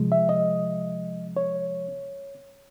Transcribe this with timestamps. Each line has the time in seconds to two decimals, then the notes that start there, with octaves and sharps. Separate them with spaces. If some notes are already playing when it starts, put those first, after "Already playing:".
Already playing: C3 F3 G#3
0.12 E5
0.29 D#5
1.37 C#5